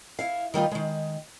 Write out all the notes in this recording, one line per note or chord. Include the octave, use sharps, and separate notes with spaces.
E4 F5
D#3 G3 D#4 F4
D#3 G#3